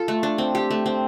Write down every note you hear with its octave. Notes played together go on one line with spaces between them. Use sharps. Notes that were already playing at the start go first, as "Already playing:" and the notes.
Already playing: F4 A4
A3
D4
C4
G4
A3
C4